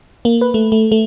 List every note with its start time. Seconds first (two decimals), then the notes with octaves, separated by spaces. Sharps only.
0.25 A#3
0.41 B4
0.54 A3
0.72 A3
0.92 A3